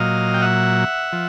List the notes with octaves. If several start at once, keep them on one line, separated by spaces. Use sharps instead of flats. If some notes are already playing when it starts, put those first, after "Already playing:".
Already playing: A#2 F#3 D#5 F5
G5
E5 F#5
F3